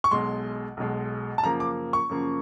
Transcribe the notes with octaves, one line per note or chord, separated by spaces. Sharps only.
C#6
B1 B2 G#3 C6
B1 B2 G#3
A5
F#2 C#3 F3 A#3 A#5
D6
C#6
F#2 C#3 F3 A#3